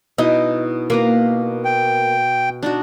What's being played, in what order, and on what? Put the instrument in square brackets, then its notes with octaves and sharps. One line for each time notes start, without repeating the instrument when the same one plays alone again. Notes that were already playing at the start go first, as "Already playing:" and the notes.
[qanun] B2 D#4 E4 [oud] D#5
[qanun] B2 B4 A#5 [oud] A#3
[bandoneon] G5
[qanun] D4 D#4 F#4